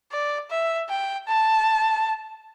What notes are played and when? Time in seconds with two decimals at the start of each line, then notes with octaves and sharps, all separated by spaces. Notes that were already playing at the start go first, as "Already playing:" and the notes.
0.12 D5
0.50 E5
0.89 G5
1.28 A5